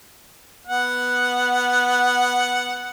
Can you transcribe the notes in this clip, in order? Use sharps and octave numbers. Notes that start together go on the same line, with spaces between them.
B3 F#5